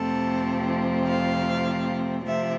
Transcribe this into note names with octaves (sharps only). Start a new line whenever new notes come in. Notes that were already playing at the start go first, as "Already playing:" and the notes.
Already playing: F2 C3 F3 A3 C4 A4
F5
C3 F3 A3 C4 E5